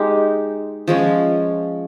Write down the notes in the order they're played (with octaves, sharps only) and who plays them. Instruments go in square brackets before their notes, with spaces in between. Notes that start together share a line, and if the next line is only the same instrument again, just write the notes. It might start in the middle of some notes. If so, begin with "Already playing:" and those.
Already playing: [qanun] G#3 D#4 G4
F3 G#3 C#4